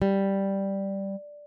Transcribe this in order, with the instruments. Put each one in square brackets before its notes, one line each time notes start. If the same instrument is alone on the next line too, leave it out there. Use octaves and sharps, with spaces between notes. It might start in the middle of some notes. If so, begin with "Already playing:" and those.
[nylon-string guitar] G3